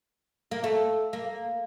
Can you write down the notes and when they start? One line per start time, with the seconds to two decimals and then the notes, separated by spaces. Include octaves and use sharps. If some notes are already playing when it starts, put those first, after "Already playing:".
0.51 A#3
0.64 A3
1.13 A#3